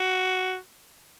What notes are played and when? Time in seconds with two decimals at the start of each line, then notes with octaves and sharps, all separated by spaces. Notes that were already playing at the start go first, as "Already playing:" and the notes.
Already playing: F#4